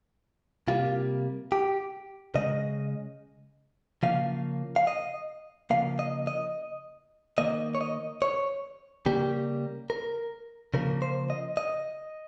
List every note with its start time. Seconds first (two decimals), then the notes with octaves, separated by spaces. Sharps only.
0.68 C3 G3 A#3 F4
1.52 G4
2.35 C#3 G#3 D#5
4.03 C#3 F3 A#3 F5
4.76 F5
4.87 D#5
5.70 C#3 F3 A#3 F5
5.99 D#5
6.27 D#5
7.38 D#3 A#3 D#5
7.75 C#5
7.81 D#5
8.22 C#5
9.06 C#3 G3 A#3 G4
9.90 A#4
10.74 C#3 F3 A#3 A#4
11.02 C5
11.30 D#5
11.57 D#5